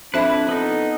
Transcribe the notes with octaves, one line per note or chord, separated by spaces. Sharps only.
F2 D4 E4 B4 C5 E5 B5
B3 D#4 A4